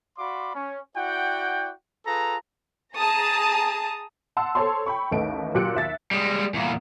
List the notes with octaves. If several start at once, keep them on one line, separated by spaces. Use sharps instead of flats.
F#4 D5 F5 B5 C6 D6
C#4
E4 F#4 D5 F#5 G5
F4 G#4 A4 B4 A#5
G#4 A5 A#5 D#6
F#5 A5 C6 E6
A4 C5 C#5 A5 C6
G5 B5 C#6
A1 D#2 A3 D#4 B4 D7
A#2 F#3 G4 F#6 C#7 D7
D#2 E5 A6
G3 G#3
E2 A#2